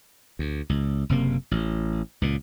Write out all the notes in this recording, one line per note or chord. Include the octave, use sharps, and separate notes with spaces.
D2
C#2
F#1 C3 A#3
A1
C#2 A#2